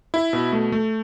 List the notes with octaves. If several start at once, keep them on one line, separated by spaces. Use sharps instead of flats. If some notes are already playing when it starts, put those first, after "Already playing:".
E4
B2
A3
A3